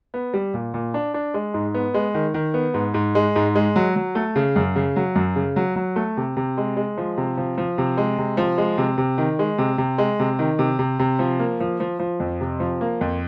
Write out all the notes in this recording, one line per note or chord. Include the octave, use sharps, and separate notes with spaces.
B3
G3
A#2
A#2
D4
D4
G#3
G#2
B3
G#3
D#3
D#3
B3
G#2
G#2
G#3
G#2
G#3
F#3
F#3
A3
C#3
F#2
C#3
F#3
F#2
C#3
F#3
F#3
A3
C3
C3
G#3
G#3
F3
C3
F3
F3
C3
G#3
C3
F3
G#3
C3
C3
D#3
G#3
C3
C3
G#3
C3
D#3
C3
C3
C3
F3
A#3
F3
F3
F3
F2
C3
F3
A#3
F2